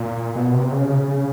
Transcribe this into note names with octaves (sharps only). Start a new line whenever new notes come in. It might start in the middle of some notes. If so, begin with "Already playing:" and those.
Already playing: A#2
B2
C3
C#3
C#3
C#3